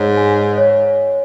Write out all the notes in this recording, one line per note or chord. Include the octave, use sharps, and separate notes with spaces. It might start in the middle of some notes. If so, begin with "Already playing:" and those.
Already playing: G#2 C#5
G#5
C#5